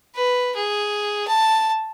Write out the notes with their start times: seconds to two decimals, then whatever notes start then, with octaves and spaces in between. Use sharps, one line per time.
0.15 B4
0.55 G#4
1.28 A5